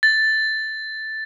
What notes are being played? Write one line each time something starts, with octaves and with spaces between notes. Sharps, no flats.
A6